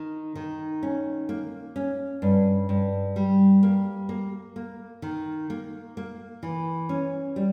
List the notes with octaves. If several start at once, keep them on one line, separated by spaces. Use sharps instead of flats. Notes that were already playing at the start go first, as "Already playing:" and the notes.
Already playing: D#3
D#3
C#4
A#3
C#4
G2
G2
G3
A#3
A#3
A#3
D#3
A#3
A#3
E3
C#4
G3